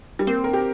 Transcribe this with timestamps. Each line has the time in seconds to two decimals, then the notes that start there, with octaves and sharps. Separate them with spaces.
0.19 G3
0.27 A#3 C4
0.44 A#4
0.53 G4